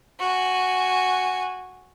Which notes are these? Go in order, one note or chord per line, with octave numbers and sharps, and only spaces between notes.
F#4 G#5